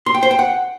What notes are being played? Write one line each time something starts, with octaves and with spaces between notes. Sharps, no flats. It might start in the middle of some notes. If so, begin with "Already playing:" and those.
C6
G5
C5
G5
F#5